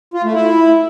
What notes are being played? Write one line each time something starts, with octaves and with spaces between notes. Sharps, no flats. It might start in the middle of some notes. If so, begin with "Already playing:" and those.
F4
A3
E4